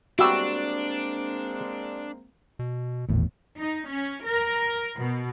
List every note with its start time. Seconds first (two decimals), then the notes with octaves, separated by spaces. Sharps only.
0.19 G3 G#3 A#3 C4 D4 F#4 E5 E6
2.59 B2
3.09 D#1 G#1 E2 A2
3.59 D#4
3.90 C#4
4.27 A#4
4.99 B2